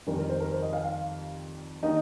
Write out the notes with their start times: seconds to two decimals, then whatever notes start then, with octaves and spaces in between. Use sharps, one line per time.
0.06 F2 D#3 G3 A#4
0.18 A#4
0.29 C5
0.40 A#4
0.51 C5
0.62 D#5
0.73 F5
0.84 F5
1.83 D#3 A#3 D#4 D#5